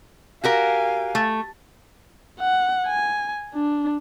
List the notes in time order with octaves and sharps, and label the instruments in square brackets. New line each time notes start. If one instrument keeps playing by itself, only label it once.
[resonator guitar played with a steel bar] F#4 G4 A#4 [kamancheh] F5 G#5
[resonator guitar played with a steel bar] A3
[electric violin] F#5
G#5
D4